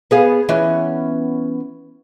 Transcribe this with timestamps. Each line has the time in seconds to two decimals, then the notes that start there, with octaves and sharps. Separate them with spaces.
0.11 B3 G#4 F5
0.49 E3 B3 C#4